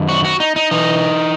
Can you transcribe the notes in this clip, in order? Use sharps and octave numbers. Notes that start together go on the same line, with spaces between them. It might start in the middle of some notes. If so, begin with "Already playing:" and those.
Already playing: F#2 D#3
F#4
F#4
D#4
D#4
E3 D#4